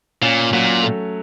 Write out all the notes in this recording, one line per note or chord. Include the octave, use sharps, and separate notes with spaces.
A#2 C#4
A#2 F#3
A3